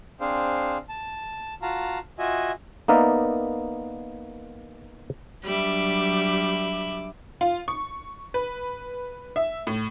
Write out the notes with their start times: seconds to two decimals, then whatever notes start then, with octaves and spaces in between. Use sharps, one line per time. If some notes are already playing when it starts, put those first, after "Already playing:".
0.20 C4 D4 G#4 C5 F5
0.89 A5
1.62 F4 F#4 F5 A5 A#5
2.19 F4 F#4 D#5 E5 G#5
2.88 A#3 B3 D#4 A#4 D5 E5
5.44 F#3 G3 D4 E5 B5 D6
7.41 F4
7.68 C#6
8.34 B4
9.36 E5
9.67 A2